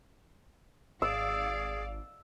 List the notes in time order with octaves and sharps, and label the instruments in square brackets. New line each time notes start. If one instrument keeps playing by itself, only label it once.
[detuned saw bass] G#1 [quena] G#4 [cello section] D5 F5 [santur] E6